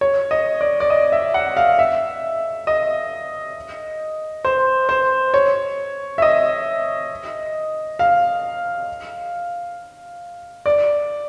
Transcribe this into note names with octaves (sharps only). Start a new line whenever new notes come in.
C#5
D#5
D5
D5
D#5
E5
F#5
F5
E5
D#5
C5
C5
C#5
E5
D#5
F5
D5